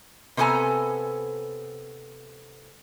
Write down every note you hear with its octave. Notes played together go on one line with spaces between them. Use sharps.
C3 B3 A4 B4 G#5 A#5